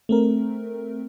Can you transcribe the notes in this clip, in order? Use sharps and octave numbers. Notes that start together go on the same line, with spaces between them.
A3 C4 A#4